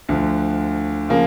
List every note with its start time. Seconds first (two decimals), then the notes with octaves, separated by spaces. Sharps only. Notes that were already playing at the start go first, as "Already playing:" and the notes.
0.09 D2 D3 F3
1.09 C#3 F3 A#3